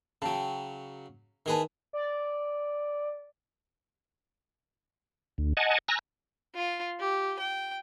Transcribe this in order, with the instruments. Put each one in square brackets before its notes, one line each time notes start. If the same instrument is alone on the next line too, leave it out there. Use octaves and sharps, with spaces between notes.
[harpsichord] C#3 F#3 [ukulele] G5 A5
[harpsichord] D#3 G#4 B4 [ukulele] E4 G#5 A5
[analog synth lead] D5
[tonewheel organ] D2
D#5 F#5 G#5 A5
G#5 A#5 E6 F#6 A#6
[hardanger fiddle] F4
G4
G5